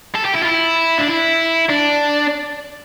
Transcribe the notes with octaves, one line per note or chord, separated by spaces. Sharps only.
A4
G4
E4
F4
E4
D4
E4
D4